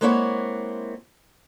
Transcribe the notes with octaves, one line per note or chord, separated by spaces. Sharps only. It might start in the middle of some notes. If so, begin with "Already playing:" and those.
G#3 A#3 C4 E4 C#5 F#5